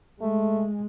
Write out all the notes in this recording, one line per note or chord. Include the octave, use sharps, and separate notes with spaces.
G#3 A3